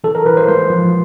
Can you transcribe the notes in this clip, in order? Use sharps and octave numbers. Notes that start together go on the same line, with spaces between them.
E3 A4
A#4
E3 B4
C5
G#3 C5
F3